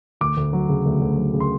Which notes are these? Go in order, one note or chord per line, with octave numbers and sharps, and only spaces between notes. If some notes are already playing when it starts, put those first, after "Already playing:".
D2 D6
D2
F#3
C#3
D2
D2
F#3
C#3
C6